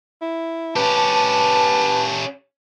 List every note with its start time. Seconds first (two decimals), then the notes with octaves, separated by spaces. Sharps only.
0.22 E4
0.76 C#4 G4 B4 A5